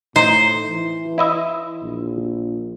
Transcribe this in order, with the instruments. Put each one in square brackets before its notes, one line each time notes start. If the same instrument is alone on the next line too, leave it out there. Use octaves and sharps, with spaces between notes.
[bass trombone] A2 [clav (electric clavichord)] D#4 [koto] C5
[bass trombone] E3
[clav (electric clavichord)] E4 D#5 E5
[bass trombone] A#1